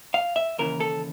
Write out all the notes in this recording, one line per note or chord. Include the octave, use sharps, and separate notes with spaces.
F5
E5
D#2 C#3 E3 A#4
A4